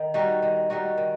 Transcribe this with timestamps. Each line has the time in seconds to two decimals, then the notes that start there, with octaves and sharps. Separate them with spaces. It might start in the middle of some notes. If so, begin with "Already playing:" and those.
Already playing: D#3
0.14 G3 D#4 F#4
0.42 D#3
0.70 G3 D#4 F#4
0.98 D#3